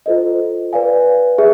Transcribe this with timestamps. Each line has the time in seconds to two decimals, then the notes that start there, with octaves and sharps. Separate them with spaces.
0.06 F4 A4 C5 D#5
0.73 B4 D5 F5 G#5
1.38 G#4 E5